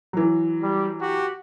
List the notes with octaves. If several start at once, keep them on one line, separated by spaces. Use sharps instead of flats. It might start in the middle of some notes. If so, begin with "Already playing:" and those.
E3 F#3
G3
F#4 G4